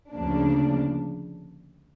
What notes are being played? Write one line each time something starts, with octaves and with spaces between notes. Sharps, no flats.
D2 C#3 F3 A#3 D4